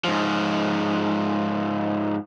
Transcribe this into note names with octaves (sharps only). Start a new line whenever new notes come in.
G#2 F3